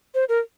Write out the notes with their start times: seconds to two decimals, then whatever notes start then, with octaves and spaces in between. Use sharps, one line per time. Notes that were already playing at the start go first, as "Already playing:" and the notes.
0.15 C5
0.29 A#4